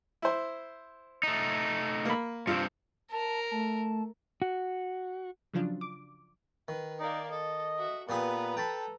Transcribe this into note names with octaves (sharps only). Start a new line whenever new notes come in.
E4 C5
A3 D#4
A#3 B5
G2 C4 F4
A#4 A5
A3 A5
F#4
C#3 F3 F#3 D4 F4
D6
D#3 B4
A#3 D#4 D5
A4 D#5
F#4 E5
A#2 B3 G4 G#4 B4 A#5
A4 G5 A5 B5